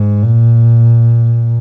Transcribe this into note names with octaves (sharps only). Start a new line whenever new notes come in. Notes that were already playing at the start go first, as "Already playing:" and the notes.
Already playing: G#2
A#2